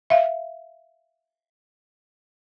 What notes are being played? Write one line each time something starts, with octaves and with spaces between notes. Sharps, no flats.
E5 F5